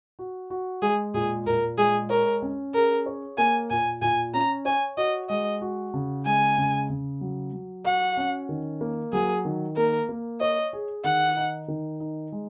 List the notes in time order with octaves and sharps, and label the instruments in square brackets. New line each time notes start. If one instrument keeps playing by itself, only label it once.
[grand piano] F#4
F#4
[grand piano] G#3 [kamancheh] G#4
[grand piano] A#2 [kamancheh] G#4
[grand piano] A#2 [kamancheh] A#4
[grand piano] G#3 [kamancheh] G#4
[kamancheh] A#4 [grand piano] C#5
[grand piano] C#4
[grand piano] G#4 [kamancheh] A#4
[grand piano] C#5
[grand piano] A#3 [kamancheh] G#5
[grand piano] A#2 [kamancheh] G#5
[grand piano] A#2 [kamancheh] G#5
[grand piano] C#4 [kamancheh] A#5
[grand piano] C#5 [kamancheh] G#5
[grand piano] F#4 [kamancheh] D#5
[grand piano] G#3 [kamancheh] D#5
[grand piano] F#4
C#3
[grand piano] G#3 [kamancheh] G#5
[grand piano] C#3
C#3
F#3
F#3
[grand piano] F#4 [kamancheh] F#5
[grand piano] C#4
D#3
A#3
[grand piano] F#3 [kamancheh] G#4
[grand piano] D#3
[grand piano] A#3 [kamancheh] A#4
[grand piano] A#3
[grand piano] C#5 [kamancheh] D#5
[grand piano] G#4
[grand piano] D#3 [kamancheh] F#5
[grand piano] D#4
D#3
D#4
G#3